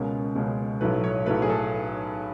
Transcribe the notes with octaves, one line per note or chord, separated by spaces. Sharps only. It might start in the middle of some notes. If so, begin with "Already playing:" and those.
Already playing: C#2 B2 G#3 C#4 A#4
C#2 B2 G#3 C#4
B1 A2 F#3 A3 B4
C#5
B1 A2 F#3 A3 B4
G#4
A4